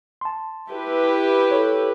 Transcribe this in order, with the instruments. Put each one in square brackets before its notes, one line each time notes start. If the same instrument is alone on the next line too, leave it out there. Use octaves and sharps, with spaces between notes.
[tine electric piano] A5 C6
[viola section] E4 G4 B4
[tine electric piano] A4 C#5